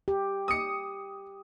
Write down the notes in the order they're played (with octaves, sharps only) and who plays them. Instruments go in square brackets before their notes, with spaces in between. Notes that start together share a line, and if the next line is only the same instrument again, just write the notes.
[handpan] G4
[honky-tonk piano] D#6 C#7